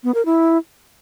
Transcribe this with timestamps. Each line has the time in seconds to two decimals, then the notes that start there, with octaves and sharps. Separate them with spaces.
0.04 B3
0.15 A#4
0.25 E4